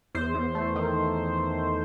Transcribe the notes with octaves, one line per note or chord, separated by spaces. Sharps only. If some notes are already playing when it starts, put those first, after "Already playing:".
E2 C5
E2
A3
D#3